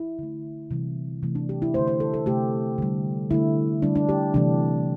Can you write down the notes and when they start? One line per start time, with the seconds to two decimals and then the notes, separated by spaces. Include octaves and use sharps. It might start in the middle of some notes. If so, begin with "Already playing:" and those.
Already playing: E4
0.19 D3 A3
0.71 C3 E3 G3
1.23 C3 E3 A3
1.35 D4
1.49 G4
1.62 E4
1.74 D3 A3 C5
1.88 C5
2.00 A4
2.14 A4
2.26 C3 A3 G4
2.78 D3 G3
3.31 D3 A3 E4
3.82 D3 G3 D4
3.96 D4
4.09 G4
4.34 C3 E3 A3 D4